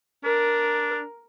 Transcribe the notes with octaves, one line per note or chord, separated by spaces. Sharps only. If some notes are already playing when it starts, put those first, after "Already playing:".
D4 A#4